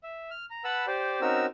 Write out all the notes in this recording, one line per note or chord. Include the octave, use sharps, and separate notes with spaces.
E5
F6
A#5
B4 F#5 A5 B5 E6
G4 C5 D5
C4 C#4 D#4 F#4 A#4 E6